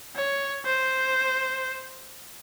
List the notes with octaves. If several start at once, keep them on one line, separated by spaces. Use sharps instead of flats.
C#5
C5